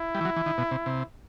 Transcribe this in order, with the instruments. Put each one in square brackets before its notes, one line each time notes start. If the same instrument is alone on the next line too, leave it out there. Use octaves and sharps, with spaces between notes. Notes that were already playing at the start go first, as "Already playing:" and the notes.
Already playing: [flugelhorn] E4
[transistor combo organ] G3
E3
F#3
E3
D#3
B2
C3
C3